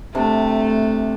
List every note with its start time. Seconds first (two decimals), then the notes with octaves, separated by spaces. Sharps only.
0.15 C3 A3 D4